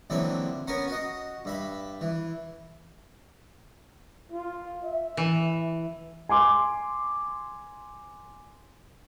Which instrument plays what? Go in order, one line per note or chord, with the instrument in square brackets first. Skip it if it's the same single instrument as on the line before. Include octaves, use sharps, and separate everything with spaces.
[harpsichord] A#1 D3 E3 F#3 C4 E5
B3 C#4 A#4 C#5 G#5
F#4 D#5
G2 E5 B5
E3
[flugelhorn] F4
E5
[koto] E3
[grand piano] G#5 C6 D6